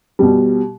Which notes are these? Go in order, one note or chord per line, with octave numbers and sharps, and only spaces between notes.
B2 G3